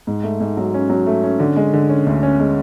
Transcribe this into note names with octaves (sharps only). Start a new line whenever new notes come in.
G#2
A3
G#2
F#3
C#4
F#3
A3
C#4
D3
G#3
D3
C#4
D2
C#4
G#3